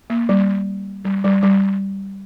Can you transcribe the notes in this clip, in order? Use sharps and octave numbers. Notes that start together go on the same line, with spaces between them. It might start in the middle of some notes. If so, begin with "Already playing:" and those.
A#3
G3
G3
G3
G3